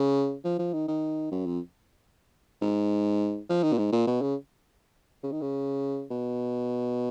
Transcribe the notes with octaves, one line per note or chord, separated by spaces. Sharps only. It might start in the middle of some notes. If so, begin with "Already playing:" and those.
Already playing: C#3
F3
F3
D#3
D#3
F#2
F2
G#2
F3
D#3
A#2
G#2
A#2
B2
C#3
C#3
D#3
C#3
B2